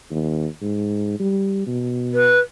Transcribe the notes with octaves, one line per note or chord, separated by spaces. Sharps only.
D#2
G#2
G3
B2
B4